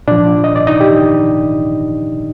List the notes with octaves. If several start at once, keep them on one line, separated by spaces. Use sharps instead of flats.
A#2 F3 D4 D5
D#5
D5
D#4 D#5
G4